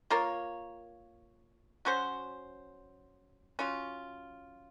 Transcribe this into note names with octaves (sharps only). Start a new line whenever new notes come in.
A#3 F4 A#4 C#5
F#3 C#4 F#4 C5
F#3 C#4 F4